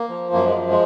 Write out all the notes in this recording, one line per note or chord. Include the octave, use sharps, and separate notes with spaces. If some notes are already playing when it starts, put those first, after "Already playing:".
Already playing: A#3
F3
F#2 A#3
G#3
F3
G#3